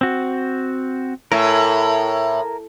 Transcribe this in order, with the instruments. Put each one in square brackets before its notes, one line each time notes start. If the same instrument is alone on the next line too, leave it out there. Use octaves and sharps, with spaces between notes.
[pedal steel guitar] C4 F#4
[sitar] A2 [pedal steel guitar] A#4 E5 G#5